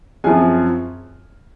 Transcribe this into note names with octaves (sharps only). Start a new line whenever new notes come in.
F#2 F3 C4 G#4 G#5